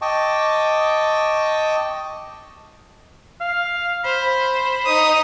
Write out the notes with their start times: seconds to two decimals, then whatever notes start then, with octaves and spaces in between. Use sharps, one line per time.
0.02 D#5 G5 A5 C#6 D6
3.41 F5
4.05 C5 B5
4.85 D#4 D#6